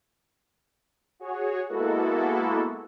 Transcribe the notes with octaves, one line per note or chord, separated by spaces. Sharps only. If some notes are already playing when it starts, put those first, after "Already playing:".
F#4 G#4 C#5
G#3 A#3 B3 E4 F#4 A4